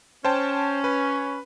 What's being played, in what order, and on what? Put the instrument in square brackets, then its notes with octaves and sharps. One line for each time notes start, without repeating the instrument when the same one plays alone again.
[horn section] C#4 [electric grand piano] C5 G5 A5
[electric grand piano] B4